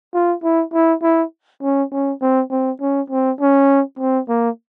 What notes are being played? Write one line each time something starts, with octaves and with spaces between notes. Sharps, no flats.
F4
E4
E4
E4
C#4
C#4
C4
C4
C#4
C4
C#4
C4
A#3